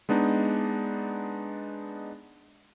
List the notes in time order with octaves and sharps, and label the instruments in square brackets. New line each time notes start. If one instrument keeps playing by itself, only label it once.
[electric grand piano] G#3 B3 D4 D#4